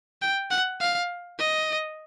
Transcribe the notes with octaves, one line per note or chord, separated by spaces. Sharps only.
G5
F#5
F5
D#5